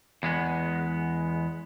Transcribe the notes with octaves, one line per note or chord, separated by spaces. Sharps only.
E2 G#3 B3